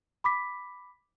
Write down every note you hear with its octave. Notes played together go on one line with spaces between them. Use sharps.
B5 D6 B6